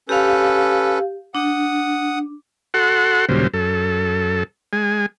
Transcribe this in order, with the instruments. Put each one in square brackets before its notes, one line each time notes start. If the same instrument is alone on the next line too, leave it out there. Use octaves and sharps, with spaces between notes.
[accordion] C#4 A4 B4 [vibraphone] G4 F5
[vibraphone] D4 [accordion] F#5 D#6
[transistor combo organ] F#4 A4 F#5 C6
D#2 A#2 C#3 F#3 G3 C5
F#2 A4
G#3 G#5